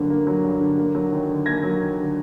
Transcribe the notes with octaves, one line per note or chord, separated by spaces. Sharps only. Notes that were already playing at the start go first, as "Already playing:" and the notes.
Already playing: G2 D3 F#3 A#3
A#3
F#3
G2
D3
A#3
F#3
D#2
D3
A#3 G#6 A#6
F#3
D#2
D3